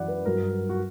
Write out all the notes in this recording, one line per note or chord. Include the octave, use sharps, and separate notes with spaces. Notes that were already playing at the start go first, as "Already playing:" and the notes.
Already playing: F#2 E3 D5 F#5
B4
G2 F#3 A#4
F#4